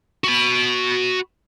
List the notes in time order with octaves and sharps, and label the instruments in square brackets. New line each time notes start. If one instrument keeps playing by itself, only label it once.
[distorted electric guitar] F#4 B5